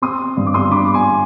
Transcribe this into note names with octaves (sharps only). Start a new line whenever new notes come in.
C4 C6 D#6
G2
D6
C6 D#6
D4 B5 D6
D6
G#5 C6